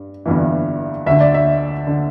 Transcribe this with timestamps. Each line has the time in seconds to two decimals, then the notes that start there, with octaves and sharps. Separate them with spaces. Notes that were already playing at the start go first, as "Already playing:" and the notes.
Already playing: G2
0.26 G1 G2 E3
1.06 D2 D3 E5
1.20 D5
1.34 E5
1.87 D3